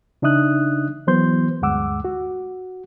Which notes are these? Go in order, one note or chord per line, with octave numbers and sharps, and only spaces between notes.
C#3 D4 D#4 E5 D#6 F#6
E3 F#3 B3 C5 C6 G6
D2 G2 G#3 F#5 D6 E6
F#4